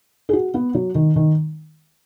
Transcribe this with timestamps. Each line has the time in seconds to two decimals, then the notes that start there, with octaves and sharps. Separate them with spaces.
0.29 G#4
0.33 F#4
0.54 B3
0.75 F#3
0.95 D#3
1.16 D#3